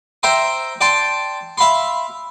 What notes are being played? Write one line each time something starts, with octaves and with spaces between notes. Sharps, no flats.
C5 E5 G5 A#5 C6
D5 G5 A5 C6
E5 F5 B5 C6